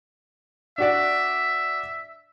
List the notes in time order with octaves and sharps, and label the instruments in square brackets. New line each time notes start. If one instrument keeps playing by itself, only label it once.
[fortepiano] D4 F#4 D5 [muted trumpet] E5